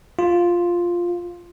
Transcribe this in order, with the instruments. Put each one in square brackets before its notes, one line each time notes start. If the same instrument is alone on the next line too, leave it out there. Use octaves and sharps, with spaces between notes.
[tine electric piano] F4